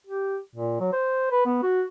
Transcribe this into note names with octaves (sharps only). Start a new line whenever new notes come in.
G4
A#2
F#3
C5
B4
B3
F#4